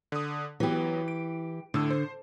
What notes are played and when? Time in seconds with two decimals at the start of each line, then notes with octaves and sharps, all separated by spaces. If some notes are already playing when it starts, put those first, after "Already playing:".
0.12 D3 D#6
0.60 E3 F#3 B3 G4
1.08 D7
1.74 A2 D3 E6
1.90 C5